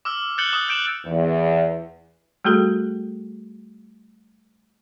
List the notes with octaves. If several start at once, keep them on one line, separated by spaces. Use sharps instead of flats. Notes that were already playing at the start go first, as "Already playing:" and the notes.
D6 E6 F6
F#6 G6 A6 C#7 F#7 G7
D6 D#6 F#7
F#6 G6 D7 E7 F#7
E2
G3 A3 F#4 G#4 A4